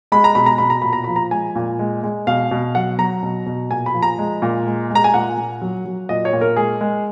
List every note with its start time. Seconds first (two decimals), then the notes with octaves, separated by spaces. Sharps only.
0.12 G#3 B5
0.24 A#5
0.35 B2 B5
0.46 A#5
0.58 B2 B5
0.70 A#5
0.82 A#2 B5
0.93 A#5
1.04 F3 B5
1.16 A#5
1.31 G#3 G#5
1.56 A#2
1.79 G#3
2.04 G#3
2.27 B2 F5
2.51 B2
2.75 F#3 F#5
2.98 F#3 A#5
3.23 B2
3.46 B2
3.70 A#2 G#5
3.86 B5
3.94 F3
4.02 A#5
4.19 G#3
4.42 A#2
4.66 G#3
4.90 G#3 A#5
5.04 G#5
5.14 A#2 F#5
5.37 A#2
5.61 F#3
5.85 F#3
6.09 A#2 D#5
6.25 C#5
6.33 A#2
6.41 A#4
6.56 G#3 G#4
6.81 G#3